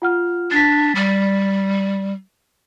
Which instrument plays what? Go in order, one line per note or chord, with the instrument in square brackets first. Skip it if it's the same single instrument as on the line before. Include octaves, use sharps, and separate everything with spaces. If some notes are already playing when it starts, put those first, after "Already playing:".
[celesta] F4 F#5 F6
[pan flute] D4 [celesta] A6 B6
[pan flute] G3